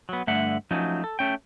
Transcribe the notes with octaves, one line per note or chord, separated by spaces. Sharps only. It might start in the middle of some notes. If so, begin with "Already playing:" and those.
F#3 B3
G2 D3 A3 E5 F#5
F3 F#3 A3 C#4 D#4
A4
A3 C#4 G5